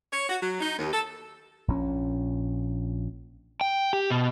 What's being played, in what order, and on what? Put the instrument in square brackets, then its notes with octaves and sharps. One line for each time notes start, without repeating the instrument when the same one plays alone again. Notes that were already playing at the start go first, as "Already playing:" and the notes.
[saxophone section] C#5
F#4
F#3
D#4
D#2
A4
[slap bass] A#1 A#2 C#4
[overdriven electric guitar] G5
G4
B2